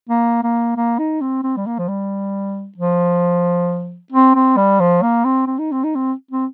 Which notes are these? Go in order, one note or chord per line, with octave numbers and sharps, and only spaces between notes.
A#3
A#3
A#3
D#4
C4
C4
G3
A#3
F3
G3
F3
C4
C4
G3
F3
A#3
C4
C4
D#4
C4
D#4
C4
C4